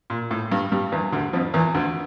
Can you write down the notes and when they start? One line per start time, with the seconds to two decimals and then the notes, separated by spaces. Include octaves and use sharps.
0.10 A#2
0.31 A2
0.51 G2 G3
0.72 G2 G3
0.92 E2 E3
1.12 D2 D3
1.33 F2 F3
1.54 E2 E3
1.74 D2 D3